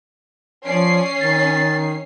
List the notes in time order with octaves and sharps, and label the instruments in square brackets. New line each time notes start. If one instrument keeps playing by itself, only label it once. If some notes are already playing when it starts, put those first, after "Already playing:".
[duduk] F3 [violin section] C#4 C7 [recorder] D5
[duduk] D#3 [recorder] A6